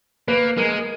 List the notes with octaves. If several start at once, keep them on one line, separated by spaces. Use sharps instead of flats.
A#3 B4
G#3 A#4